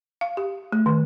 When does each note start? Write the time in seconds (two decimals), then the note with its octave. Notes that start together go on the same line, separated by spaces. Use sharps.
0.21 F5
0.37 G4
0.72 A3
0.86 D#3